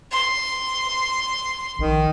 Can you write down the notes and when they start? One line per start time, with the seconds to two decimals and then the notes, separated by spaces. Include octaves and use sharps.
0.12 C6
1.79 A#1 D#3